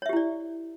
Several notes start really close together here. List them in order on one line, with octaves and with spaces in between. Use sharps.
C#5 E5 G4 E4 D5